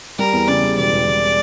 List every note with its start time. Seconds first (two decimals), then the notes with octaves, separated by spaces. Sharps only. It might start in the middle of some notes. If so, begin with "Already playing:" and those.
0.18 G3 A#4
0.33 E2
0.48 C#3 D5
0.63 G3
0.77 E1 D5
0.92 E1
1.06 E1